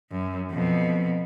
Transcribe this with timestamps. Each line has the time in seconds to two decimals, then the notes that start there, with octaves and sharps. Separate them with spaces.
0.11 F#2
0.51 F2 B2